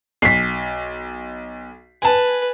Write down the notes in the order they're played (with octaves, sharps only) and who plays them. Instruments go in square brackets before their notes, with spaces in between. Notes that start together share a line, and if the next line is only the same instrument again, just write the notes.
[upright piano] B1 [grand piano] B6 C7
[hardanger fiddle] B4 [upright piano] G#5 A5